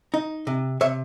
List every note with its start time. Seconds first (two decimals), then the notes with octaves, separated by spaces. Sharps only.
0.14 D#4
0.47 C3
0.81 C3 C#5 E5